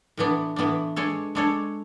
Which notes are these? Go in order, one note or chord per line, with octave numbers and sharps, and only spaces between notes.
A2 E3 B3 D4
A2 E3 B3 D4
G#3 D4 A4 C#5
G#3 D4 A4 C#5